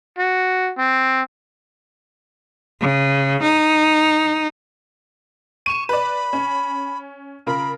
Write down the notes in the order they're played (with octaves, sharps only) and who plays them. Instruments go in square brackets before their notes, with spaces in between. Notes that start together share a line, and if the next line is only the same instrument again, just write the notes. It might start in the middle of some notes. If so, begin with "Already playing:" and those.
[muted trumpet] F#4
C4
[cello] C#3
D#4
[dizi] C#6 [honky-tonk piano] D#7 E7
[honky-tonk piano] B4 D5 [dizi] B5
[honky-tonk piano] C#4
[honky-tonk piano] C#3 F4 A#4 [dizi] B5